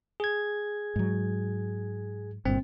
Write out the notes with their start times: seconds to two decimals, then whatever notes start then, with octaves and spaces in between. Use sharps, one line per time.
0.20 G#4 G#6
0.96 G#2 F#3
2.45 G1 G2 A#2 C4